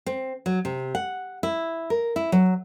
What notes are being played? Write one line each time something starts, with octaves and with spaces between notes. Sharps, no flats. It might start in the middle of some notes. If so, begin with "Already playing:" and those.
C4
F#3
C3
F#5
E4
A#4
E4
F#3